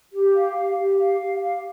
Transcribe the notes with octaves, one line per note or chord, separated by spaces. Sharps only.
G4
F5
G4
G4
F5
G4
F5